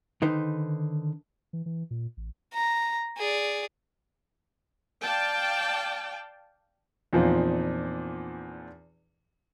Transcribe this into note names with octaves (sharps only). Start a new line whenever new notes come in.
D3 D#3 D#4 B4 C5
E3
E3
A#2
A1
A#5
G#4 D5
D5 F5 G5 A5
E2 A#2 F3 C4 D#4